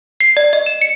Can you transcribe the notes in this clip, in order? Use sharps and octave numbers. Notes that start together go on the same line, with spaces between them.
C7
D5
D#5
E7
C#7